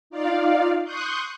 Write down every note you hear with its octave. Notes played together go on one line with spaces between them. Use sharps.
D#4 F4 D5 F5
C6 C#6 D#6 F#6 G6